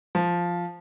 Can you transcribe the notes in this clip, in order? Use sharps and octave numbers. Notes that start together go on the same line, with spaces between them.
F3